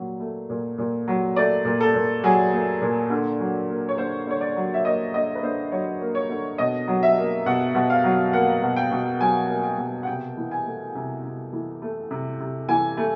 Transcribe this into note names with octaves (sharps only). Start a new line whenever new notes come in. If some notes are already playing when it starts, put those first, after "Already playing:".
Already playing: A#2 F#3
A3
A#2
A#2
F#3
A3 D5
A#2
A4
A#2
F#3 G#4
A3
A#2
D3
F#3
A#3
C#5
D3 C5
D3 C#5
D5
F#3
E5
A#3 D#5
D3 D#5
B4
D3 C5
F#3 C#5
A#3
C#5
D3
B2 D#5
F#3
E5
A#3
B2 F#5
B2
F5
F#3
A#3 F#5
B2
G5
B2
F#3 G#5
A#3
G5
B2
F#5
C3 G5
E3
G#5
A3
C3
C3
E3
A3
C3
C3
E3 G#5
A3